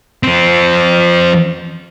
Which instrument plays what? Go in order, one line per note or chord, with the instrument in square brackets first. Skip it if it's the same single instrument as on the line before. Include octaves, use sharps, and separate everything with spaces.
[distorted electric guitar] F3 C4